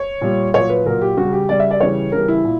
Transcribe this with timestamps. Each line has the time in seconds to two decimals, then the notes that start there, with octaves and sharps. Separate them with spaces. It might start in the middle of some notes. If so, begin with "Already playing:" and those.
Already playing: C#5
0.21 A#2 G3
0.54 A#2 F#3 C#5
0.70 B4
0.85 A#2 F#3 A#4
1.02 G4
1.17 C#3 G3 F#4
1.33 G4
1.49 C#3 G3 D5
1.60 E5
1.71 D5
1.80 C#3 E3 G3 C#5
2.12 C#3 E3 G3 A#4
2.28 E4
2.44 A#2